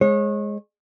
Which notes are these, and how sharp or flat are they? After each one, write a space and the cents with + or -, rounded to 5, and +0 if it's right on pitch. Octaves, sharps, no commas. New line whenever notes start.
G#3 +0 C#5 -35